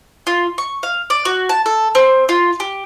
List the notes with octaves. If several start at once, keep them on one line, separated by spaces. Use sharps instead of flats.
F4
C#6
F5
D5
F#4
A5
A4
C4
F4
G4